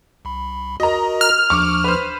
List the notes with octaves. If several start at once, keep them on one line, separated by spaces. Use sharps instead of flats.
C2 B5
F#4 A#4 D#5 A#5
F6
D#2 F3 D4 C#6 D6
B4 C5